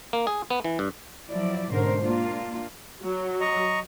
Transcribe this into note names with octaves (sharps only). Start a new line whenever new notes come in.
A#3
G#4
B3
E3
G2
F3 F#3 E4 D5
G#2 B2 D3 C#4 A#4 C5
A#3 D4 F4
F#3
D#5 A#5 C#6